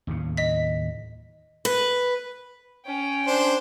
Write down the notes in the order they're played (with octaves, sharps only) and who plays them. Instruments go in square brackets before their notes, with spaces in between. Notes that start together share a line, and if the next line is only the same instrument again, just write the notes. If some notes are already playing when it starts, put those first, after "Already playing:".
[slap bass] D#2 A2 C#3
[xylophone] D#5 B6
[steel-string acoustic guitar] B4
[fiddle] C#4 G5
[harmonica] D4 C5